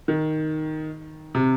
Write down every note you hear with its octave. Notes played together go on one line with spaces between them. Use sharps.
D#3
C3